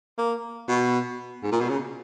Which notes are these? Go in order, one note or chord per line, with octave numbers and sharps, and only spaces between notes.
A#3
B2
G#2
A#2
B2
C#3